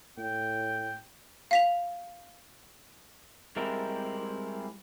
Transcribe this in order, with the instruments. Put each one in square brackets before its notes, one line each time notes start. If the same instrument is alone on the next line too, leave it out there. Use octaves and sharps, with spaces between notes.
[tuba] A2 [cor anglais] G5
[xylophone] F5 B6 F7
[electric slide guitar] G3 G#3 C4 E4 A#4